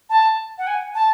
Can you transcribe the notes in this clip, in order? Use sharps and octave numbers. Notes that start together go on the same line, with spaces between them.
A5
F#5
G#5
A5